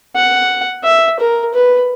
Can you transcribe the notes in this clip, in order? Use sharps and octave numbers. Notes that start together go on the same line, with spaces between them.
F#5
E5
A#4
B4